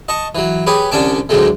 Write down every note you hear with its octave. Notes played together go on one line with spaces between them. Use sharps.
D#5 A5 C#6
E3 F#3
G4 G#4 B4 C#5
C2 D3 C#4 G#5 A5 D6
D2 A2 D3 F#3 G#3 A3